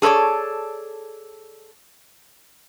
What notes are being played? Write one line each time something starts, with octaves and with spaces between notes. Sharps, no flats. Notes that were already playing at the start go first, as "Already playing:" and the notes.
G#4 A4 B4 C#5 D5